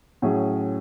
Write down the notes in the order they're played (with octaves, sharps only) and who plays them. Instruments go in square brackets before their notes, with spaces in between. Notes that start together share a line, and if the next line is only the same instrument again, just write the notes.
[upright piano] A2 F#3 C#4 G#4